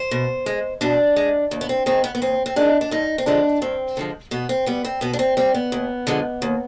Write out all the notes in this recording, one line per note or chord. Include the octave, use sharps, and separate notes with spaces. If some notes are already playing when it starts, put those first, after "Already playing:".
Already playing: C5
B2
G#3
B2 D4
G#3
D#2
B3
C4
D#3 G#3 C4
B3
B3
D#2 C4
C4
D#3 G#3 D4
D4
G2 D#4
C4
D3 F3 G#3 D4
G2 C4
D3 F3 G#3
B2 B3
C4
G3 B3
C4
B2 B3
D4
C4
G3 C4
B3
D#2
D3 F3 G#3
D#2